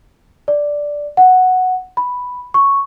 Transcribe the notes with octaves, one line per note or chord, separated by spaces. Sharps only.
D5
F#5
B5
C#6